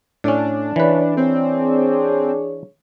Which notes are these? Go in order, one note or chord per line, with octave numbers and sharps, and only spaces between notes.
A2 C#4 D4
C#3 E3 B4 C#5 D5
C4 D4 G#4 C#5